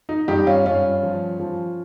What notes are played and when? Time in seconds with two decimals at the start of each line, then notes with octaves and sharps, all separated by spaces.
0.09 D#4
0.28 G2 D#4 G4
0.47 C#4 F4
0.65 G2 C#4 F4
1.03 F3
1.40 F3